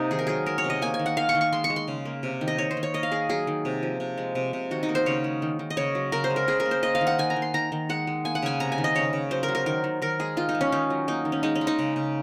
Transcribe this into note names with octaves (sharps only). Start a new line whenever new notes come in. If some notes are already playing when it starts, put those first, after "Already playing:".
Already playing: C3 A#3 D#4
D#3 G#4
A#4
F#3 G#4
G#3 A#4
C#5
C3
D#5
A#3 G#5
G#5
D#3
F#5
D#3 F5
C#6
D#3
C#6
G#3 C6
C#6
G#3
C6
C#3
A#3
C3
D#3
D#5
D#3 C#5
C5
D#3
C#5
A#3 D#5
F5
A#3 G#4
F#3 G#4
D#3
C3
F3
C3
G#3
C3
C3
D#3 F#4
D#4
A#3
C5
C#3 C#5
G#3
D#3
D#3
D#5
C#3 C#5
F#3
C#3 A#4
C5
G#3
A#4
C#3 G#4
A#4
A#3
C5
A#3 D#5
F5
D#3
F#5
D#3 G#5
A#5
D#3
C6
D#3 A#5
D#3
G#3 F#5
G#3
A#3 G#5
F#5
C#3 G#5
C3 A#5
G#5
D#3
D#5
C#3 C#5
C#3
F#3 C5
A#4
F#3
A#4
D#3 A#4
D#3
D#3 A#4
G#3 G#4
D#3 F4
D#4
G#3
C#4
D#3 D#4
F#3
A#3 D#4
D#3
C#4
G#3 D#4
C#4
G#3
D#4
C#3
C#3